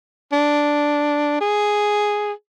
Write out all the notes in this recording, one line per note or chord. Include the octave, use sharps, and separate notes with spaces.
D4
G#4